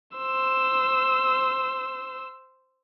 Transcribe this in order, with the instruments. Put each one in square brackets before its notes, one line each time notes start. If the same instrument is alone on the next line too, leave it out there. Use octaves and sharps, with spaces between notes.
[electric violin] C5 E6